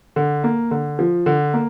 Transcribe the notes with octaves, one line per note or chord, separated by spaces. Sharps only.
D3
A#3
D3
F3
D3
A#3